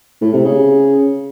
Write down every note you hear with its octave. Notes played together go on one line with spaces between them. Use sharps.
A2
C3
C#3